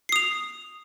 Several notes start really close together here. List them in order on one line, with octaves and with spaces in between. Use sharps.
C7 D#6 F7